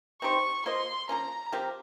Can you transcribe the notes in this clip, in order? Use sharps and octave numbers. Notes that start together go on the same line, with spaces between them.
C4 D#4 G4 C5 C#6
A#3 F4 C5 D#5 C6
F3 A#3 C#4 A#5
F3 C4 G4 A#4